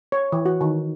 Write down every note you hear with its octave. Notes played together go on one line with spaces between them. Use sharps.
C#5
E3
F#4
D#3